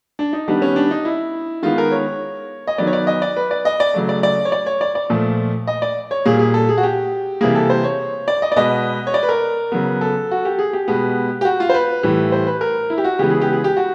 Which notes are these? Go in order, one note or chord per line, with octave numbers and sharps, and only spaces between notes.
D4
D#4
D#3 G3 B3 D4
C#4
D4
D#4
E4
D#3 G#3 B3 F4
A#4
C#5
D#5
D#3 F#3 B3 D5
C#5
D5
D#5
D5
B4
D5
D#5
D5
C#3 F#3 A3
D5
D5
C#5
D5
C#5
D5
D5
A#2 F3 A3
D#5
D5
C#5
A#2 G3 A#3 G#4
G#4
A4
G#4
F#4
G4
C3 E3 G3 A#3 G#4
A4
C5
C#5
D5
D#5
D5
B2 G#3 B3 D#5
C#5
D5
B4
A#4
C#3 F#3 B3
A4
F#4
G4
G#4
G4
B2 G#3 B3
G4
F#4
F4
C5
B4
A2 E3 G3
C5
B4
A#4
E4
G4
F#4
C#3 E3 G#3 B3 G4
G#4
G4
G#4
G4
F#4